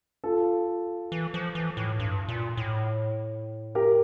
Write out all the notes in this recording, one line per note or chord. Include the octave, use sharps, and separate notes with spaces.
F4 A4
E3
F3
E3
A2
G2
A#2
A2
G4 A#4